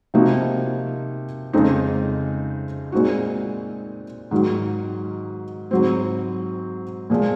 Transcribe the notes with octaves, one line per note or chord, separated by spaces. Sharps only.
C3 F3 A#3 D#4 F#4
F2 C#3 G#3 C4 D#4
A#2 G#3 C4 D#4 F#4
G#2 D#3 F#3
G#2 F#3 C4
A#2 F3 G#3